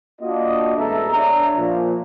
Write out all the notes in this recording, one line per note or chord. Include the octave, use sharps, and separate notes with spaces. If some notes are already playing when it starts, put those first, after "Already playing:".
A#3 D4 F4 F#4 D#5
A1 G#3 B3 A4 E5 A#5
D4 C#5 E5 A#5
A#2 F3